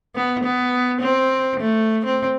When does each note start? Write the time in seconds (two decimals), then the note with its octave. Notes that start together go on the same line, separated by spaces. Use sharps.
0.15 B3
0.43 B3
1.01 C4
1.60 A3
2.05 C4